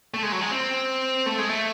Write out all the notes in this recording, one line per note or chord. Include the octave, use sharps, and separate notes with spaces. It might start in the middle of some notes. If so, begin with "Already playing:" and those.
A3
G#3
F#3
G#3
C4
A3
G#3
A3